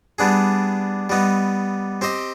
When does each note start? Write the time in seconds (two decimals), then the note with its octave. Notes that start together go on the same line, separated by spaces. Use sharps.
0.19 G3 B3 D4 G#4
1.09 G3 B3 D#4
2.01 C4 G4 C5 D#5